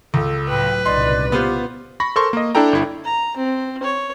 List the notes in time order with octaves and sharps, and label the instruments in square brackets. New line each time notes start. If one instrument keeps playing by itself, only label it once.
[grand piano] C#2 [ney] A4
[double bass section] A2 F#3 [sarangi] B4 [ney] G5
[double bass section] C2 A#2 C#3 [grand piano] D#4 C6 [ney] D5
[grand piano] B3 F4 C5 [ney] G4
[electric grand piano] B5 C#6 A#6
A4 A#4 C5 C6 C#6
A#3 D#5
D4 E4 A4 G5 A#5
G1 E4
[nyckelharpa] A#5
C4
C#5